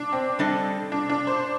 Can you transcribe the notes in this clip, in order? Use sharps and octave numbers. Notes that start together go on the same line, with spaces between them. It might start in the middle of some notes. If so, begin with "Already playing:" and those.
Already playing: D4
C4
G3 D4 A4 D#5
D4
D4
C5